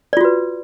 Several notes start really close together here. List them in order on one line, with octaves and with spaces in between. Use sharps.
D5 F4 F#4 B4